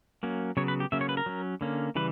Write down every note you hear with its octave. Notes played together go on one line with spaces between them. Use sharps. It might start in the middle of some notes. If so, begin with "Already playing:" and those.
F#3 A#3 C#4
C#3 F#3 B3 C#5
B4
G4
C#3 F#3 A#3 C#4 E5
C#5
B4
A#4
F#3 C#4
D3 A#3 C#4
C#3 E3 G3 B4